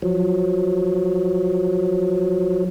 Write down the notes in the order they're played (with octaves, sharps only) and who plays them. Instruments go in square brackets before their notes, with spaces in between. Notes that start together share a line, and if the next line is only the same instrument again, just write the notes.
[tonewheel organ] F3 F#3